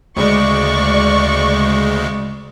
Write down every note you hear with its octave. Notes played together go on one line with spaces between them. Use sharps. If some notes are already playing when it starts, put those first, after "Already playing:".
D2 C#3 G#3 D5 C#6